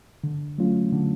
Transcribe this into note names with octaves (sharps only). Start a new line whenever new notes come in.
D3
F#3 A3 C#4 F4
D3